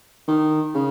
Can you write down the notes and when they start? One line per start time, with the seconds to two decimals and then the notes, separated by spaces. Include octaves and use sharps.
0.28 D#3
0.74 C#3